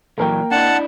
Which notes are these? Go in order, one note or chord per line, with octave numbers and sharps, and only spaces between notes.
A#2 E3 F#3 A#3 A#4 G5
D4 E4 F#5 A5